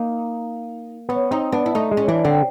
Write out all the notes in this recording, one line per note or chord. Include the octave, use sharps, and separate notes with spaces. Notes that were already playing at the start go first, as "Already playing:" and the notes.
Already playing: A#3 D#4
B3 C#4
C4 D#4
B3 D4
E4
A3 D#4
G#3
C#4
E3 D4
D3 C4